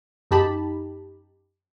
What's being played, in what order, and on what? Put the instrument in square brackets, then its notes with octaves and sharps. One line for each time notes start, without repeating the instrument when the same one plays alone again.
[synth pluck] F#2 D#4 G4 A5 B5